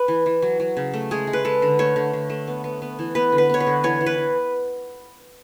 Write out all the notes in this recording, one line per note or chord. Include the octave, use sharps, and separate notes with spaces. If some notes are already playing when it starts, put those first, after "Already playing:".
Already playing: B4
E3
E3
F#3
F#3
C#3
A3
G#3 G#4
G#3
B4
G#3 A4
D3
A3 C#5
D3
D3
A3
B3
B3
B3
E3
B3 B4
D3
B4
B3 C#5
B4
D3
E3 C#5
E3
B4
E3